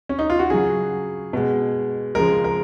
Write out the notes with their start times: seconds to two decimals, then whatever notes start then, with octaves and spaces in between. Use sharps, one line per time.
0.09 C#4
0.19 D#4
0.30 F4
0.39 F#4
0.50 C#3 F#3 G#4
1.33 B2 G#3
2.15 C#3 F3 G#3 A#4
2.44 A#4